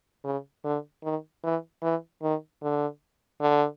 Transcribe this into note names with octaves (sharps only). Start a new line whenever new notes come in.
C#3
D3
D#3
E3
E3
D#3
D3
D3